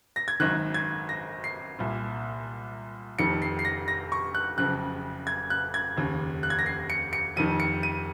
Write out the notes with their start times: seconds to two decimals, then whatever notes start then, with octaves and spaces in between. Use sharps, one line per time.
0.16 A#6
0.28 G#6
0.40 G#1 F#2 D#3 F#6
0.74 G#6
1.09 A#6
1.44 C7
1.79 C2 A#2
3.19 F1 F2 D#3 C#7
3.42 C7
3.59 C7
3.65 A#6
3.88 A#6
4.12 C#6
4.35 F#6
4.58 F#1 F2 C#3 F#6
5.27 G#6
5.50 F#6
5.74 G#6
5.97 F1 D#2 C#3
6.43 F#6
6.50 G#6
6.59 A#6
6.66 C7
6.90 C#7
7.13 C#7
7.36 F1 F2 D#3 D#7
7.60 C#7
7.83 D#7